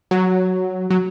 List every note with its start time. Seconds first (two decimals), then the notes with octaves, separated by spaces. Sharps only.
0.11 F#3
0.90 F#3